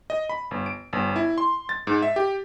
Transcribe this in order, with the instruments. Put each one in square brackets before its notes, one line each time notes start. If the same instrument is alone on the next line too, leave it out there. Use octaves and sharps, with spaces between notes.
[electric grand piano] D#5
B5
G1
D7
G1
E4
C6
A6
G#2
E5
G4